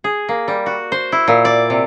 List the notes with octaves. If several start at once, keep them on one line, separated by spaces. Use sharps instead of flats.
G#4
A#3
G3
F#4
C5
E4
A#2
D5
C3